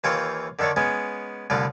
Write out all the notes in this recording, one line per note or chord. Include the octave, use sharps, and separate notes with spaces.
D#2 E3 F4 C5 C#5 G5
D3 D#3 D4 A4 C#5
G#3 B3 C#4
C2 A2 D3 D4 F4